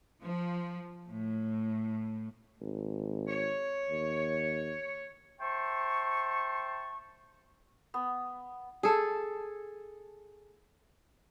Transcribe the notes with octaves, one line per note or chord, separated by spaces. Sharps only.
F3
A2
G#1
C#5
D#2
C5 E5 G5 A5 C6 C#6
B3
G#4 A4